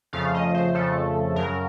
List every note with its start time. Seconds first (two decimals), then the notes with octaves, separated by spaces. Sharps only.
0.13 F2 C#3 F3 A3 F5
0.34 D#5
0.54 C5
0.74 F2 C#3 F3 A3 A4
1.36 F#2 C#3 F#3 A#4